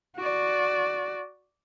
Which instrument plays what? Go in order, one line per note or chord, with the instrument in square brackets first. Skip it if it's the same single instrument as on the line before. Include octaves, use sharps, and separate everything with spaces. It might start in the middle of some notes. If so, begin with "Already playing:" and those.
[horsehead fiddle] F#4 D5